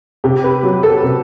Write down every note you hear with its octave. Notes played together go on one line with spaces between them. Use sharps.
C3 G4
B4
F#3
A4
C3